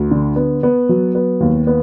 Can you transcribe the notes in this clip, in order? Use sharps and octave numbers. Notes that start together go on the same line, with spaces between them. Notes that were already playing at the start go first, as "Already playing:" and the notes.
Already playing: D2
D3
B3
B3
F#3
B3
D#2
B3